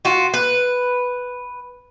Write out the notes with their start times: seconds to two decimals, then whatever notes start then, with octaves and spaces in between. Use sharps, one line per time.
0.05 F4 F#4
0.34 B4